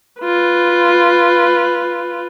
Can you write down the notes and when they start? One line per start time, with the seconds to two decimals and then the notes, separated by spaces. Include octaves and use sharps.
0.22 F4 B4